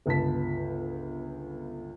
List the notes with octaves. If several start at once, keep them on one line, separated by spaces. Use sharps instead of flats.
G1 C#2 B3 A5 B6